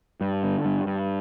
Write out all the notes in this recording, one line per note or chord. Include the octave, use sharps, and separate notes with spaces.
G2
D3
G2
G2